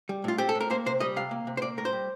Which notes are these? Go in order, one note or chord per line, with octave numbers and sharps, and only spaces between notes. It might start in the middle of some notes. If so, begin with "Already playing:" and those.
G3
A2 F4
C4 G4
A4
A2
A#4
A#3 C5
C3 C5
G3 D#5
C3 F5
A#3
C3
C5
A#3 D5
A2 A#4
C5
G3